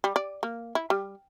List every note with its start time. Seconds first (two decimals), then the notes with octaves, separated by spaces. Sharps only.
0.04 G3
0.16 D5
0.43 A#3
0.75 E4
0.90 G3